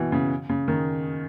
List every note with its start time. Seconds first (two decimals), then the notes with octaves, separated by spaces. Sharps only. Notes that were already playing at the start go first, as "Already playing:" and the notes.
Already playing: B2 E3
0.12 C#3
0.49 C#3
0.68 D#3